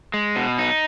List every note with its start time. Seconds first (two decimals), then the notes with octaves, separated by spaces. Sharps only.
0.14 G#3
0.36 B2
0.58 D#4